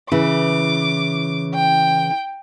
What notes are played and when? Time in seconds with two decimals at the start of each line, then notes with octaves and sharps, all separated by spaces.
0.12 C#3 E3 D6
1.55 G5